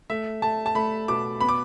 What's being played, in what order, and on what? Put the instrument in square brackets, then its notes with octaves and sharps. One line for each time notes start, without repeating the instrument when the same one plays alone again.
[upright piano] A3 [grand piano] E5
[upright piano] A3 [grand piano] A5
[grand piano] A5
[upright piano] A3 [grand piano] B5
[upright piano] B2 [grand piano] D6
[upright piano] B3 [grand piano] B5
[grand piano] D6